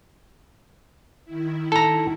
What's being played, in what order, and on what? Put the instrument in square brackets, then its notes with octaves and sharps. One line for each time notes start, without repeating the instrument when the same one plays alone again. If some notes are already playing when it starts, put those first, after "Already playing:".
[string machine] D#3 E4
[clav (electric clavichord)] A4 A#5